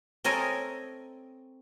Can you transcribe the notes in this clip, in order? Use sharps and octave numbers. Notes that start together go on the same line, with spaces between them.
C4 A4 A#4 C#5 D#5 G#5